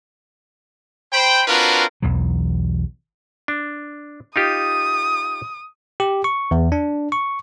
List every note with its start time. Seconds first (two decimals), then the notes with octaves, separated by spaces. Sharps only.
1.13 C5 G5 B5
1.48 C4 D4 F4 F#4 A#4 B4
2.02 B1 E2 E3 F#3
3.48 D4
4.36 D#4 F4 G4 D#6
6.00 G4
6.24 C#6
6.51 E2
6.72 D4
7.12 C#6